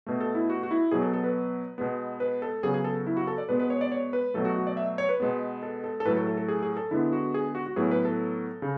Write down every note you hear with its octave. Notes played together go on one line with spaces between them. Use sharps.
B2 A3
A4
E4
F#4
F#4
E4
B2 F#3 B3 G#4
A4
A4
B4
B2 G#3 B3
B4
A4
C#3 F#3 B3 G#4
G#4
A4
E4
F#4
A4
D5
B2 G#3 B3 B4
B4
C#5
D5
C#5
B4
B2 F#3 A3 A4
F#4
F#4
D5
E5
C#5
B4
B2 G#3 B3
A4
A4
A4
A2 F#3 A3 B4
A4
A4
A4
G#4
G#4
A4
D3 G#3 B3 E4
F#4
G#4
F#4
F#4
A2 F#3 B3 G#4
B4
A4
C#3